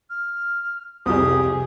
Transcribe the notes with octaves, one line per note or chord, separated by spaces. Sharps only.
F6
C2 F2 G4 G#4 D#6